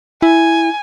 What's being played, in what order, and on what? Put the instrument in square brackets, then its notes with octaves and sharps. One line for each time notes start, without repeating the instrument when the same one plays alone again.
[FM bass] E4 [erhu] G#5